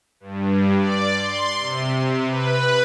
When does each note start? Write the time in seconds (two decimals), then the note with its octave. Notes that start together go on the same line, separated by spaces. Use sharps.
0.20 G2
0.77 D5
1.15 C6
1.59 C3
1.96 C3
2.26 B4